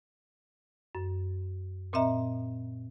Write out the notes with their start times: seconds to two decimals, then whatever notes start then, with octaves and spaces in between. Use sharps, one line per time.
0.95 F#2
1.93 A#2 C4 D#5 E5 A#5